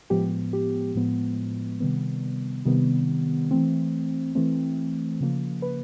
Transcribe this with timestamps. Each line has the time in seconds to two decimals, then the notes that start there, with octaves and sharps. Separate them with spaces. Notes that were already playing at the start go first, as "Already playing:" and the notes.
0.10 A2 F3 G#3 B3 G4
0.53 G4
0.95 A2 F3 G#3 B3
1.80 C3 D#3 G3 B3
2.65 C3 D#3 G3 B3
3.51 E3 A3 C4
4.35 E3 A3 C4
5.21 C#3 F3 A#3
5.62 B4